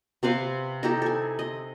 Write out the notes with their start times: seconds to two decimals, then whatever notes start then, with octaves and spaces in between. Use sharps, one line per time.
0.23 C3 C4 B4 F5
0.83 D#4 E4 G4 A4
1.02 A4 G#5
1.39 D#5